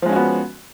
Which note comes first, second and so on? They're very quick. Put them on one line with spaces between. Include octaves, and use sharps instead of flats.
F3 G#3 C#4 F#4 B3